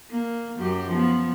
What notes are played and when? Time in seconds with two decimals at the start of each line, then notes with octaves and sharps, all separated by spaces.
0.10 A#3
0.58 F#2 F#3 G4
0.88 F3 B3